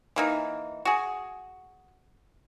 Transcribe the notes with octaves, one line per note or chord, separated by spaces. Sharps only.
E3 A#3 D#4
F#4 G#4